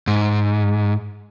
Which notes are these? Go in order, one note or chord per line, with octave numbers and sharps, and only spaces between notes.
G#2